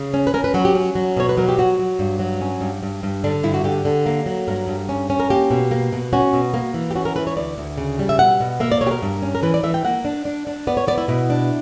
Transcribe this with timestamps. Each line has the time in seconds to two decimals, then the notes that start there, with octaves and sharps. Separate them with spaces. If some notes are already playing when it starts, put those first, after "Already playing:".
Already playing: C#3
0.14 C#4
0.27 B4
0.34 C#4 A#4
0.44 B4
0.54 F#3 F#4
0.65 G4
0.75 C#4
0.95 F#3
1.17 B2 C#5
1.29 B4
1.37 F#3 A#4
1.49 G4
1.58 F#3 F#4
1.79 F#3
1.99 G2
2.19 F#3
2.41 C#4
2.61 G2
2.83 G2
3.03 G2
3.24 D3 D4
3.43 G2 E4
3.54 F#4
3.64 D3 G4
3.85 D3
4.06 A#3
4.26 F#3
4.47 G2 A#4
4.68 G2
4.89 C#4
5.10 C#4
5.20 A#4
5.30 A#3 G4
5.50 B2
5.71 A#3
5.92 B2
6.13 C#4 F#4
6.33 B2
6.54 A#3
6.74 E3
6.91 G4
6.95 C#4 F#4
7.05 A#4
7.15 E3 B4
7.27 C#5
7.37 D2 D5
7.58 D2
7.78 C#3
7.99 G3
8.09 E5
8.19 B2 F#5
8.40 B2
8.60 A#3 E5
8.72 D5
8.81 B2 C#5
8.87 G4
8.91 A#4
9.02 G2
9.22 C#4
9.35 A#4
9.43 E3 B4
9.54 D5
9.63 E3 E5
9.74 G5
9.85 A#3 F#5
10.05 D4
10.25 D4
10.47 D4
10.67 B3 D5
10.77 C#5
10.88 B3 D5
10.98 E4
11.08 B2 E4
11.30 D4